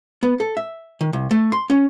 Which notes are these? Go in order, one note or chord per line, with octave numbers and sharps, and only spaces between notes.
B3
A4
E5
D#3
C2
A3
C6
C#4